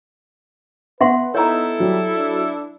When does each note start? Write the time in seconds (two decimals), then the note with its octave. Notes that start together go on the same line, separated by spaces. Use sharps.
1.01 B3 B4 E5 F#5 C6
1.35 D#4 E4 A4 C#5 A#5
1.80 F#3 G3
2.18 D4